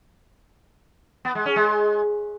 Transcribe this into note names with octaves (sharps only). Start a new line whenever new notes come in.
B3
G#3
C#4
G#3